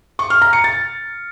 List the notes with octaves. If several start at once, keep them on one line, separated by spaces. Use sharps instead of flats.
C#6
F6
A#5
C#7
A6